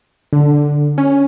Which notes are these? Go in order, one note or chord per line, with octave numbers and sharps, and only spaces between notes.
D3
C#4